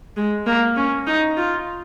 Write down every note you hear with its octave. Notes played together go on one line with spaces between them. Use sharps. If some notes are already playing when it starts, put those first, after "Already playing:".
G#3
A#3
C#4
D#4
F4